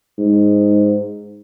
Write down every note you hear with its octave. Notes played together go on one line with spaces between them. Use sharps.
G#2